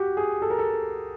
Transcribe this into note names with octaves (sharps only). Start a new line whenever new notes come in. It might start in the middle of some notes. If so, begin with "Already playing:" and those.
Already playing: F#4 G4
G#4
A4
A#4
A4